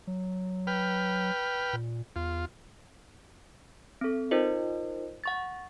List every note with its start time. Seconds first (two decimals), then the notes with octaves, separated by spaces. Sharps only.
0.07 F#3
0.67 B4 G5 F6
1.73 A#2
2.16 E2 F4
4.01 C4 A4
4.31 D#4 F4 A#4 C5 D#5
5.24 F#5 C#6 A6